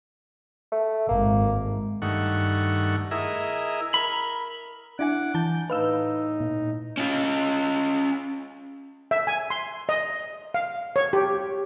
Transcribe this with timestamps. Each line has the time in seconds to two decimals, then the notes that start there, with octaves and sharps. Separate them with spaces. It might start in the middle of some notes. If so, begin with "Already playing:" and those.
0.72 A3
1.09 G#1 A#3
2.02 G2 D#3 A3 F#5 C#6
3.11 E4 G#4 A#4 D#5 E5
3.94 A#4 B5
4.99 D4 E4 F#5 G#5 D6
5.35 E3 A5 G6
5.70 A2 D#4 B4 F5 E6
6.40 A#2
6.97 C#4 F4
9.11 E5
9.27 G#5
9.50 C6
9.89 D#5
10.54 F5
10.96 C#5
11.13 G4